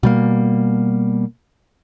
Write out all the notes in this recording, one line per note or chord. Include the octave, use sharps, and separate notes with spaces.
B2 G3 A#3